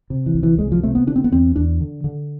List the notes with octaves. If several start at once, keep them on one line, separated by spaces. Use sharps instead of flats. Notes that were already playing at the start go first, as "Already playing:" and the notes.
C3
E3
C2
E3
C2 G#3
F3
C3 A3
B3
D3 D4
C4
B3
E2 C4
E2 D4
D3
D3